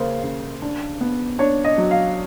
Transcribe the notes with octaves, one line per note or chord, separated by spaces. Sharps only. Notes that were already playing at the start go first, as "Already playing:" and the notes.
Already playing: C#3 A#3 C5
C#3
D4
B3
D4 C#5
D#5
F#3
F5